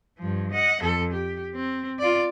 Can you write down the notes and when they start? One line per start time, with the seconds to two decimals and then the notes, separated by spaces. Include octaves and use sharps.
0.18 G2 F3
0.52 D#5 F#5
0.83 F2 A4
1.13 G4
1.54 C4
1.99 F4 D5